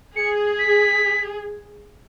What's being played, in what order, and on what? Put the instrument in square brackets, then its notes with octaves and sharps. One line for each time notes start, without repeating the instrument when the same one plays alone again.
[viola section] G#4 [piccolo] C#7
[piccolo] B6